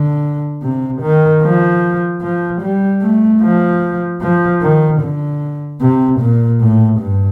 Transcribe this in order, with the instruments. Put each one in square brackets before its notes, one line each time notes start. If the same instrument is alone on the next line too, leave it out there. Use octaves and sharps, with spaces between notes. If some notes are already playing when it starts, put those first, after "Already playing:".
Already playing: [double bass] D3
C3
D#3
F3
F3
G3
A3
F3
F3
D#3
D3
C3
A#2
A2
G2